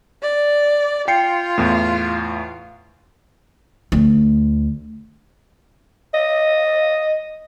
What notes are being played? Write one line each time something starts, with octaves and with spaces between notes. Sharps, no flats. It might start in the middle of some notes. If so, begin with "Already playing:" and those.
D5
F4 G5 C7 C#7
E2 A2
D2
D#5